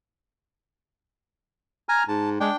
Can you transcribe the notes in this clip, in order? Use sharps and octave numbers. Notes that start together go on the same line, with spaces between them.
G#5 A#5 F6
G#2 A5
G#3 D4 G5